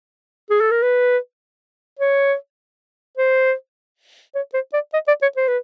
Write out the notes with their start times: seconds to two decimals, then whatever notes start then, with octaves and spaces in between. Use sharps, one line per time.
0.50 G#4
0.61 A4
0.71 A#4
0.82 B4
1.99 C#5
3.17 C5
4.35 C#5
4.54 C5
4.73 D5
4.93 D#5
5.07 D5
5.22 C#5
5.37 C5
5.48 B4